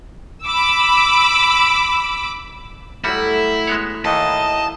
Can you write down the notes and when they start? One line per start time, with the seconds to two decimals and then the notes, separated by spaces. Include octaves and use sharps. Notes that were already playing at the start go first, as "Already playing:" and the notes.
0.44 B5 D6 E6
3.04 A2 F#3 G3 E4 F#4
3.67 G#3 B3 C#5
4.05 D#2 D#3 E3 E4 D#5 A5